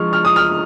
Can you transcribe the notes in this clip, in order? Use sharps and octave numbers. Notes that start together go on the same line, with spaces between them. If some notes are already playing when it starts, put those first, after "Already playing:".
Already playing: F3 G#3 C#6 F6
F6
D#6
F6